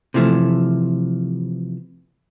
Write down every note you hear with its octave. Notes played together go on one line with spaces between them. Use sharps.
C3 E3 F3 A3